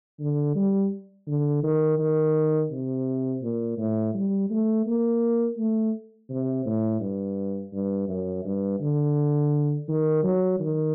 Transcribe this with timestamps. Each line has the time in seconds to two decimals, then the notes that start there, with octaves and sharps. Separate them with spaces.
0.20 D3
0.55 G3
1.27 D3
1.63 D#3
1.99 D#3
2.71 C3
3.42 A#2
3.78 A2
4.14 G3
4.50 A3
4.86 A#3
5.58 A3
6.30 C3
6.65 A2
7.00 G2
7.73 G2
8.08 F#2
8.45 G2
8.80 D3
9.88 D#3
10.23 F#3
10.59 D#3